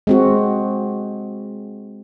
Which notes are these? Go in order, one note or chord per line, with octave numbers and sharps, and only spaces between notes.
G#3 C4 F#4